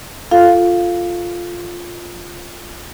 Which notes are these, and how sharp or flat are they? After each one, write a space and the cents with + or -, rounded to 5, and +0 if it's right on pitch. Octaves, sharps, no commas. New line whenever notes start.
F4 +0 A4 +0 F5 +0